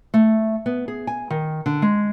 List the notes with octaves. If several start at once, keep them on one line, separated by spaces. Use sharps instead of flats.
A3
B3
G#4
G#5
D#3
D3
G#3